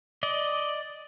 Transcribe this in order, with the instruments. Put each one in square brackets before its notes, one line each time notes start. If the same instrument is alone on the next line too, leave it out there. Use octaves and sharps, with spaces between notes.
[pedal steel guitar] D5 D#5